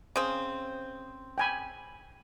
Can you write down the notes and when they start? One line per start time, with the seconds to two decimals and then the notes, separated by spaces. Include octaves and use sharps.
0.16 C#3 C4
1.38 G5 G#5 B5